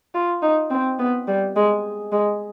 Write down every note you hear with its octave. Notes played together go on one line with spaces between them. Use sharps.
F4
D#4
C4
B3
G3
G#3
G#3